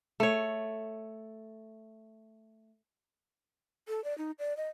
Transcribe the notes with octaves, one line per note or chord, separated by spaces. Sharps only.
A3 C#5
A4
D5
D#4
D5
D#5